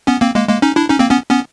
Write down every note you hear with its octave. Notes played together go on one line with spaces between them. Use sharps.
B3 C#4
A#3 C4
G#3 A#3
G#3 A#3
C#4 D#4
D4 E4
C#4 D#4
A#3 C4
B3 C#4
B3 C#4